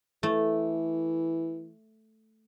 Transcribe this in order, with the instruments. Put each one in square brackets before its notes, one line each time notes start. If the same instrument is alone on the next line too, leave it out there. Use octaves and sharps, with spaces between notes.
[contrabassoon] E3 [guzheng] A3